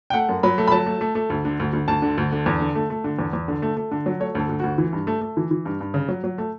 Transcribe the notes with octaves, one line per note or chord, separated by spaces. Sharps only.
G5
A3 F#5
F#2
F#3 B5
A3
B5
F#3 A5
A3
A3
A3
D2
D3
D2
D2
D2 A5
D3
D2
D3
E2
D3
A3
A3
D3
E2
E2
D3
A3
A3
D3
F#3
A3 C#5
D2
A4
D2
D2 F#4
E3
G2
A3
A3
E3
E3
G2
G2
C#3
F#3
F#3
A3